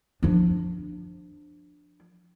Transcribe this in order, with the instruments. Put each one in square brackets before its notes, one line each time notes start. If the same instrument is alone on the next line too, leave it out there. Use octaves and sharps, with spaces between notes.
[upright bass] F3 D4